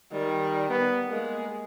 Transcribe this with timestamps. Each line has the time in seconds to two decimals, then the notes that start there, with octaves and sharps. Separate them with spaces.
0.12 D#3 G3
0.69 B3
1.09 G#3 A#3